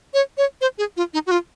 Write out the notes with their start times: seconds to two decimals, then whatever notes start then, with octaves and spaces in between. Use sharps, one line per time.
0.14 C#5
0.38 C#5
0.61 C5
0.78 G#4
0.97 F4
1.14 D#4
1.27 F#4
1.31 F4